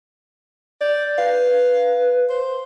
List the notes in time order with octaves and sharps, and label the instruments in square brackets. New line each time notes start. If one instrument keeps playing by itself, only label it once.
[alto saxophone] D5 [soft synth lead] G6
[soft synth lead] B4 [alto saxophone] F5
[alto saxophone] C5